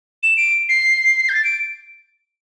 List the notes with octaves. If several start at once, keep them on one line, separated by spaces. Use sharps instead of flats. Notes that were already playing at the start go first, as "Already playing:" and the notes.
E7
D7
C7
G6
A6
D7